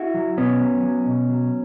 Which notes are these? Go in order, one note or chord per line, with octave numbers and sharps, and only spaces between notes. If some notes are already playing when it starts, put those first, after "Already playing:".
Already playing: E4 F#4
F#3
B2 B3 C#4
F#3
F#3
B2
F#3